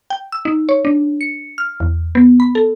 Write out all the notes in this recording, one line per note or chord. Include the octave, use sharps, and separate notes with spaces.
G5
E6
D#4
C#5
D4
C#7
F6
E2
B3
B5
A4